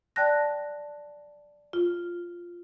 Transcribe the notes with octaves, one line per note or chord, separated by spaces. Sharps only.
D5 G5 A5 F#6 A#6
F4